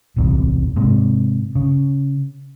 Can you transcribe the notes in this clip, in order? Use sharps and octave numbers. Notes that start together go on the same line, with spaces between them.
D1 B1 E2 C3
G#2 C3
C#3